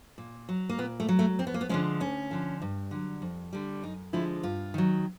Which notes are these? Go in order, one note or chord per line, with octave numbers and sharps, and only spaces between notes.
A#2
F#3
A#3
A#2 B3
A3
F#3
A3
F2 C4
B3
A#3
B3
D3 F3 G#3 C#4
D2 C#4
D3 F3
G2
D3 F#3
F2
D3 G3
F#2 D#4
D3 F3 G#3 E4
G2 F4
D#3 F#3